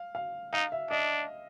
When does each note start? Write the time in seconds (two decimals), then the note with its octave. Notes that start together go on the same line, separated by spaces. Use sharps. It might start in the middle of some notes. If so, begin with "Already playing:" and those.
Already playing: F5
0.15 F5
0.53 D#4 F5
0.72 E5
0.90 D4 D#5